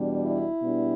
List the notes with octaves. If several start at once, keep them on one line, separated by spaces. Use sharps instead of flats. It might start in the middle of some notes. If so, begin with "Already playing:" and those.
Already playing: E2 B2 G3 D4
E4
B2 G3 B3 D4